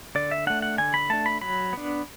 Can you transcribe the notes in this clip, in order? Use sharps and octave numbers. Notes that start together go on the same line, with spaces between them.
D3 D5
E5
A3 D4 F#5
F#5
D3 G#5
B5
A3 D4 A5
B5
F#3 B5
B3 D4